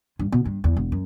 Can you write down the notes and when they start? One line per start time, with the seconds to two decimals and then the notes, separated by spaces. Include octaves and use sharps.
0.19 G2
0.32 B2
0.45 G2
0.64 E2
0.77 E1
0.92 F#2